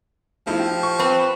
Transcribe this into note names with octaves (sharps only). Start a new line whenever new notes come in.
F3 A3 D#4 E4
G4
C#6
C4 B4